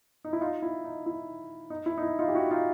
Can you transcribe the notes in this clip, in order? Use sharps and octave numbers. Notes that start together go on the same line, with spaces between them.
D#4
E4
D#4 F4
E4
D#4
E4
D#4
E4
D#4
E4
D#4 F4
G4
E4 F#4
D#4 F4